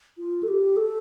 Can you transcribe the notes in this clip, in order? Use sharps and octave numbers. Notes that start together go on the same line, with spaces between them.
F4
A4
G4
A4